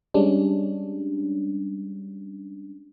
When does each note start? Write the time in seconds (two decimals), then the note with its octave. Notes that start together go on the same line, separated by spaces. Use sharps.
0.14 G3 G#3 C#4 D4